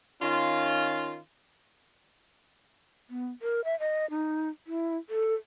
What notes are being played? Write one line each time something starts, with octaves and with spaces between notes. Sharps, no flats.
D#3 C#4 F4
B3
A#4
E5
D#5
D#4
E4
A4